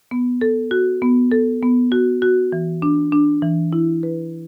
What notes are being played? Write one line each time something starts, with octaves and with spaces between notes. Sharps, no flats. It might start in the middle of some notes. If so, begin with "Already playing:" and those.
B3
A4
F#4
B3
A4
B3
F#4
F#4
E3
D4
D4
E3
E4
B4